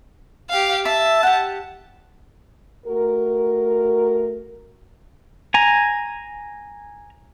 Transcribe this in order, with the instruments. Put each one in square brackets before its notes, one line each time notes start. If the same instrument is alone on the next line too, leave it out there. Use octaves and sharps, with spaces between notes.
[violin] G4 F5
[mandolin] E5 [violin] A5
[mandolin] G4 F#5
[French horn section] A3 F#4 A#4
[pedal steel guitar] G#5 A#5